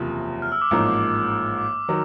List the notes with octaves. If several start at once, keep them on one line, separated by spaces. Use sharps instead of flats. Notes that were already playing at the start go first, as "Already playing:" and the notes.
Already playing: F#1 E2 C3 F3 A#3
F6
E6
D6
A1 G#2 F3 A#3 D#4
D6
D6
D#3 F#3